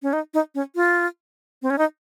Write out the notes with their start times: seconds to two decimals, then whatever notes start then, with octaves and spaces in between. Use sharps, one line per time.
0.02 C#4
0.13 D#4
0.34 D#4
0.55 C#4
0.75 F4
1.62 C4
1.70 C#4
1.78 D#4